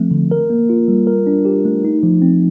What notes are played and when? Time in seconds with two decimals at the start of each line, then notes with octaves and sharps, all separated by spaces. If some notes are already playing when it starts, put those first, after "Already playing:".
Already playing: F3 A3 C4
0.11 D3
0.31 A#4
0.50 A#3
0.69 F4
0.88 G3
1.07 A#4
1.27 D4
1.45 G4
1.65 A3
1.85 D#4
2.03 F3
2.22 C4